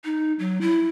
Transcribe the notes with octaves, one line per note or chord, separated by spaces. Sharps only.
D#4
F#3
E4